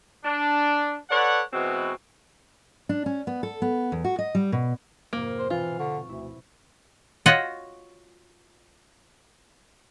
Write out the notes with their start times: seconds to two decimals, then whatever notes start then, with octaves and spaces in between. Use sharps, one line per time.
0.25 D4
1.10 A4 B4 C#5 D5 F#5
1.53 B2 E3 G#3 C4 F#4
2.89 D4
3.06 C#4
3.27 B3
3.43 A4
3.62 B3
3.92 E2
4.04 F#4
4.19 D#5
4.35 G3
4.52 B2
5.13 F2 G#2 C3 A#3
5.39 C5 B6
5.50 B2 E3 C4 F4
5.79 D3 C#6
6.09 D2 E4
7.26 F4 F#4 C#5 D#5 F#5